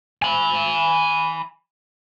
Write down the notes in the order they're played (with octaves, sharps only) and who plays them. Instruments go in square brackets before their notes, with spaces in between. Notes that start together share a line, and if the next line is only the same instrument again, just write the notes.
[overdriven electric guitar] G#5 B5